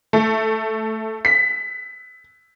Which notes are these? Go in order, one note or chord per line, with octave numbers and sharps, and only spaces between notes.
A3
B6